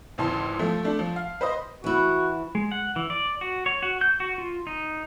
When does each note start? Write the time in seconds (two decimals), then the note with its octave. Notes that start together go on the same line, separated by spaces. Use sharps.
0.18 G#1 C#2 E3 A5 C6
0.59 F3 A3
0.84 A3 D4
0.99 F3
1.16 F5
1.41 B4 C5 D#5
1.84 E3 E4 F#4
2.55 G#3
2.71 F#5
2.96 E3
3.10 D5
3.41 F#4
3.66 C#5
3.83 F#4
4.01 G6
4.20 F#4
4.38 F4
4.67 D#4